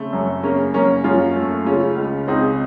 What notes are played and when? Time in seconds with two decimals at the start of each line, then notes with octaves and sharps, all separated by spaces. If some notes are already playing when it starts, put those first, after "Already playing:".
Already playing: C#3 A3 C4
0.13 F#2
0.43 C#3 A#3 C#4
0.74 F#2 A#3 C#4
1.04 F#2 C#4 F4
1.36 A3
1.66 C#3 C#4 F4
1.97 C#2
2.28 C#2 C4 D#4